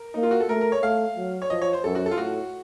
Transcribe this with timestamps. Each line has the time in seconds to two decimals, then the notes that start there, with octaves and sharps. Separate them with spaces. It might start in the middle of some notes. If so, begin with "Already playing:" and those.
Already playing: A#4
0.14 A#3 D#4
0.23 F4
0.31 F#4
0.40 A4
0.49 A3 A#4
0.61 A#4
0.72 C#5
0.82 A3 F5
1.17 F#3
1.42 C#5
1.50 F3 D#5
1.62 C#5
1.73 C5
1.84 F#2 A4
1.95 F#4
2.06 A4
2.11 F4
2.17 A2 F#4